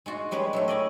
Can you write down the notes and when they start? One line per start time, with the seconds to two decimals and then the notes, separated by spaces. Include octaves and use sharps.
0.06 G#3 F4 F#4
0.31 G3 G#3 C#4 B4
0.53 F#3 G3 A3
0.68 C#4 D5 D#5